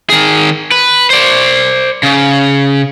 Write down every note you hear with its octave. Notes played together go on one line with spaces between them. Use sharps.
D#3 G#4
B4
C5 D5
C#3